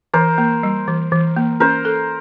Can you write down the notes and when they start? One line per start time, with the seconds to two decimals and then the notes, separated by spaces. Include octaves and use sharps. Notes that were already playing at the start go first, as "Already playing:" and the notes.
0.13 E3 A#4 C5
0.38 A#3
0.63 G3
0.88 E3
1.12 E3
1.36 A#3
1.60 C#4 A#4 C5
1.85 A4